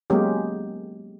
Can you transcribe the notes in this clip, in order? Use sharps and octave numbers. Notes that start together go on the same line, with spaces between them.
F#3 G#3 A#3 B3 C#4 G4